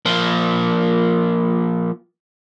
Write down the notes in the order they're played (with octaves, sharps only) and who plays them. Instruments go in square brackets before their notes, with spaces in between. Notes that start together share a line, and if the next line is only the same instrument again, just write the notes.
[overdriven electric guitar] F3 A#3